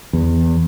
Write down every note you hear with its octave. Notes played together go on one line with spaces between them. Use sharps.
E2